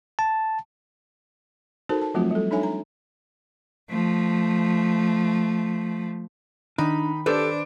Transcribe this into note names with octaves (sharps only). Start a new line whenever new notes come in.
A5
D#4 F#4 A4 A#4 C5 A5
A5
F3 F#3 A3 C4 F4 F#4
G3 A4
D4 D#4 A4 C#5 E5 G#5
A#5
F3 A3
D#3 D4 D#4 B5
D4 G4 A4 B4 C5